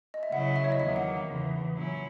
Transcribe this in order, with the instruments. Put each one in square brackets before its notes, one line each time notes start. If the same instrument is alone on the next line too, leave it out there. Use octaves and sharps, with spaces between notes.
[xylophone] D#5
E5
[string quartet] C#3 F#3 C#4 E4 [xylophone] F#5
[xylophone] E5
C#5
D#5
[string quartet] E2 D#3 F#3 A#3 [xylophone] E5
[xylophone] F#5
[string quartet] E2 C#3 E3
A#2 F#3 C#4 E4